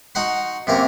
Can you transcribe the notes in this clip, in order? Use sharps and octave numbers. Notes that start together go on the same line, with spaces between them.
D#4 F#4 F#5 C6
F#2 C3 A#3 A#4